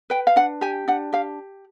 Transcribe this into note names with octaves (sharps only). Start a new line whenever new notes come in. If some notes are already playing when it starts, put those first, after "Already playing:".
B4 G5
F5
D4 F#5
G4 G#5
D4 F#5
G4 F5